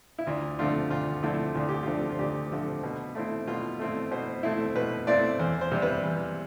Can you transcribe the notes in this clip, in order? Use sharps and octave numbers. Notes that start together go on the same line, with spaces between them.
E4
D2 F4
D3 F3 A3 C4 F4
D2 F4
D3 F3 A3 C4 E4
D2 F4
G4
D3 F3 A3 C4 F4
F4
D2 G4
D3 F3 A3 C4
B2
A3 C4 E4
B2 F4
A3 C4 E4
B2 C5
A3 C4 E4
B2 B4
A3 C4 E4 D5
E2 C5
C5
C3 G3
B4
E2